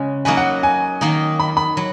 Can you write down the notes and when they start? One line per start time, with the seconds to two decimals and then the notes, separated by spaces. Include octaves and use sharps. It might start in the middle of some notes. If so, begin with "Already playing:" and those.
Already playing: C#3 G#3 C#4 F#4
0.25 F#3 A#3 D#4 F#4 B4 G#5
0.37 F#5
0.63 G#5
1.01 D#3 A#3 D#4
1.40 B5
1.57 B5
1.77 F#3